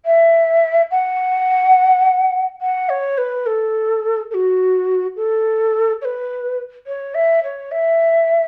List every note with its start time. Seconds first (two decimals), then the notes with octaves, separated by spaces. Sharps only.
0.05 E5
0.91 F#5
2.61 F#5
2.89 C#5
3.17 B4
3.46 A4
4.31 A4
4.34 F#4
5.16 A4
6.01 C#5
6.05 B4
6.86 C#5
7.14 E5
7.43 C#5
7.71 E5